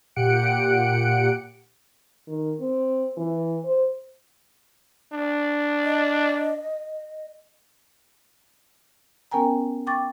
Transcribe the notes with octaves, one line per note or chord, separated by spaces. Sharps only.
A#2 G4 F#5 F#6 C#7 D7
D#3
C4
E3
C5
D4
D#5
B3 C#4 A#4 G5 G#5 A#5
G5 C#6 D6 A6